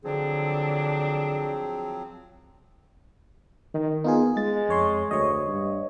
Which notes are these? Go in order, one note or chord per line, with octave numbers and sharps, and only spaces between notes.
D3 F3 F#3 C4 D4 G#4
D#3
B3 D#4 F4 G#4
G#3 A6
F2 C#5 C6
D2 C#5 D#5
G2